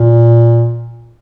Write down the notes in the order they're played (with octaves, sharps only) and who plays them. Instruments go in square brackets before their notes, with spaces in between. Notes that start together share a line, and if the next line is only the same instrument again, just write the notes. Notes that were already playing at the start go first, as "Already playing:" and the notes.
Already playing: [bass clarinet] A#2